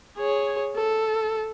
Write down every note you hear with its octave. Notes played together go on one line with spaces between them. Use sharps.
G#4 C#5
A4